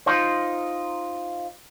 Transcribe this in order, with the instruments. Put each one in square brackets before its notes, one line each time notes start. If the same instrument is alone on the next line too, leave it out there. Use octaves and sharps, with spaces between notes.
[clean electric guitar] D#4 F4 C5